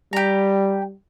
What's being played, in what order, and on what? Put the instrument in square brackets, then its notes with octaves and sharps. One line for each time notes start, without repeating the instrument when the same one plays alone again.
[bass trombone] G3 [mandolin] G4 A#5